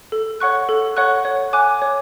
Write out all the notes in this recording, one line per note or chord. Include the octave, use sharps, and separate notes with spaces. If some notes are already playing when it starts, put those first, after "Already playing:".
A4
C#5 F#5 C#6 F#6
A4
C#5 F#5 C#6 F#6
C#5
G#5 D6 F#6
C#5